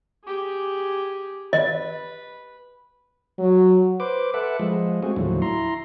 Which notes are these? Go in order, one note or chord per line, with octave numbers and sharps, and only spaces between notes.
G4 G#4
B4 D#5
F#3
B4 C5 D6
A4 B4 E5 F#5
F3 G#3
A3 C4 F#4 G#4
D#2 A2 D3 F3 F#3
E4 A#5 C6